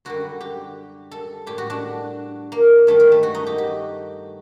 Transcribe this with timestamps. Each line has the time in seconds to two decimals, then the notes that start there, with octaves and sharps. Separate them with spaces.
0.05 F#2 D3 G3 F#4
0.41 G4
1.11 A4
1.46 A2 G3 G4
1.58 F#4
1.70 D4
2.52 A#3
2.87 G2 D#3 G3 A3
3.00 G3
3.12 A3
3.23 F#4
3.35 D#4
3.47 G4
3.58 G4